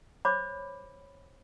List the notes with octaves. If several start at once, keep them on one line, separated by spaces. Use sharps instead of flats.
C5 C#5 B5 D6